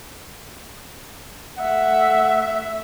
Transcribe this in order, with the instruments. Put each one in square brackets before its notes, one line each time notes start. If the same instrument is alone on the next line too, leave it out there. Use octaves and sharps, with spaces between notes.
[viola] A3 E5 [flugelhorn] F#5